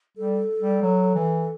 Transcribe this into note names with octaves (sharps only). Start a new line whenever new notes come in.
G3 A4
G3
F#3
E3